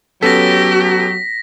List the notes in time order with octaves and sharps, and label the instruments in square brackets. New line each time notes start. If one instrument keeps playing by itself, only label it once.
[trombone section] F#3 [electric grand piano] B3 C#4 A4 [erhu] G4 [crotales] A#6 B6